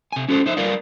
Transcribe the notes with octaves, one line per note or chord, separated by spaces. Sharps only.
C3 G#5
C#4 F#4 A4 C5
D#4 C5 E5
G3 A#4 B4 D5 F5